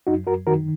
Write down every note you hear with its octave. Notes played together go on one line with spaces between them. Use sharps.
F#2 D#4 F#4
F#2 F#4 A#4
D#3 F#4 A#4